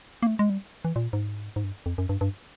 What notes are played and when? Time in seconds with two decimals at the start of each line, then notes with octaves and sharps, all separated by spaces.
0.23 A#3
0.27 A3
0.39 G#3
0.50 G3
0.85 E3
0.96 A#2
1.13 G#2
1.56 G#2
1.64 G2
1.86 F2
1.98 F#2
2.09 G2
2.21 G2